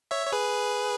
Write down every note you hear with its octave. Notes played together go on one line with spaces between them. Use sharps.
C#5 E5
C#5
G#4 B4